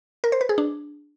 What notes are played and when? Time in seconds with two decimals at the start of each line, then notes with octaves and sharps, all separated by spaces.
0.24 A#4
0.32 C5
0.41 B4
0.49 G#4
0.58 D4